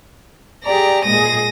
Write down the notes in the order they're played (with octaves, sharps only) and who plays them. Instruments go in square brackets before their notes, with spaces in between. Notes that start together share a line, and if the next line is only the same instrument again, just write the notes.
[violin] G4 A#5 [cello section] G#4 D5
[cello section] A#2 G#3 G#4 [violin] A#6 D#7